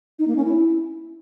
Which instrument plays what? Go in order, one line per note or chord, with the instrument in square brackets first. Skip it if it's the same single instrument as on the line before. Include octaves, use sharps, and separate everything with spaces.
[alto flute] D#4
A#3
C#4
E4